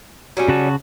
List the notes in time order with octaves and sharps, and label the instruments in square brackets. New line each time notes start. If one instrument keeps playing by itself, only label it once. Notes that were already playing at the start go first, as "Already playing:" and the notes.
[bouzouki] F#3 G3 C#4
[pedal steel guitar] C#3 F#4 A5